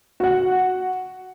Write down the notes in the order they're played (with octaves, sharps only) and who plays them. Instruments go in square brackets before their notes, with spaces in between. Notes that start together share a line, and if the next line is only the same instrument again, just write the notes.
[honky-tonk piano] F#4 F#5